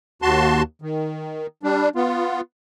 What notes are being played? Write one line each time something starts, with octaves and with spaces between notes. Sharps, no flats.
D#2 F#4 A5 C6
D#3
G3 D4
B3 F4